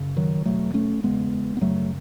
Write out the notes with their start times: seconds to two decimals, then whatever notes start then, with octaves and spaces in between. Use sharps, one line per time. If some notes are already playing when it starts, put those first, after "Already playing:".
Already playing: F#2 C#3
0.17 D#3 F#3
0.45 E2 B2 F#3 A3
0.74 A3 C#4
1.03 E2 C#3 G#3 B3
1.57 B3
1.61 F#2 C#3 F#3 A3